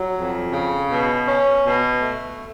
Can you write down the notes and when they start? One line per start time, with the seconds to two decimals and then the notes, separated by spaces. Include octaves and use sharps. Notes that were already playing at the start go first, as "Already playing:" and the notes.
Already playing: F#3
0.15 F2
0.52 C#3
0.90 B2
1.27 C#4
1.64 B2
2.01 A3